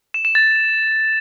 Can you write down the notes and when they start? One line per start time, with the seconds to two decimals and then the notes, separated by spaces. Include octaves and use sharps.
0.14 E7
0.25 E7
0.35 A6